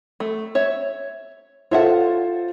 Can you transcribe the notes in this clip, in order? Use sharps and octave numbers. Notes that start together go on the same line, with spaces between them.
A3
C#5 E5
F4 A4 C5 C#5 E5 F#5